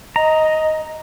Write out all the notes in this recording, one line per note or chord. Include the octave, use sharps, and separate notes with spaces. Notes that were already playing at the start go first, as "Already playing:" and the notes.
D#5 A#5